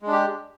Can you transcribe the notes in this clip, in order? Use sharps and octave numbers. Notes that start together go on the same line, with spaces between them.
G#3 D4 G4